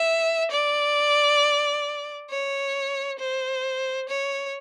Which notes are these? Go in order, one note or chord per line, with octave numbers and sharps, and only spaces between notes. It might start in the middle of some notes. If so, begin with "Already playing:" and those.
Already playing: E5
D5
C#5
C5
C#5